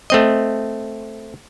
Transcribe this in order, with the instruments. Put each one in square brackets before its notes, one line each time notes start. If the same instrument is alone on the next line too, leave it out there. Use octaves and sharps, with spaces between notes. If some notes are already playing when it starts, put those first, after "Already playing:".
[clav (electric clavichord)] A3 C4 D#5